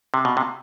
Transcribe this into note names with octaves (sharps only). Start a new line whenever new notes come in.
C3
B2
C3